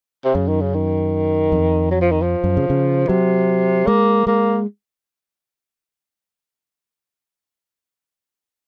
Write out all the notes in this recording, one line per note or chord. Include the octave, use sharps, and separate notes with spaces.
C3
F#2 C#3
D#3
C#3
D#3
F2
F#3
F3
D#3
F3
F#2
C#3
C#3
C3 F#3
G#3 A#3
G#3 A#3